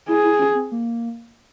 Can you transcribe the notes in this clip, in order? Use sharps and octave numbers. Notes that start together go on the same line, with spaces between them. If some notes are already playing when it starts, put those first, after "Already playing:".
E4 G#4
E4
C#4
C4
A#3